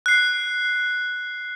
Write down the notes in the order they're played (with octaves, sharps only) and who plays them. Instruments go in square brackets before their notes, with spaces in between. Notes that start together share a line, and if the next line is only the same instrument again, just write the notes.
[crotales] F#6 C7